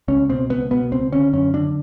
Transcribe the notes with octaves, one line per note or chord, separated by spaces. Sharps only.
C#2 C#4
B2 C4
C#2 B3
B2 B3
C#2 C4
D3 C#4
F#2 C#4
D3 D4